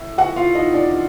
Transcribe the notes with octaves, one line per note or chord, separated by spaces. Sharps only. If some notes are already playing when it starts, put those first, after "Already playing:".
Already playing: A2
F#4 F#5
F4 F5
D#4 D#5
D4 D5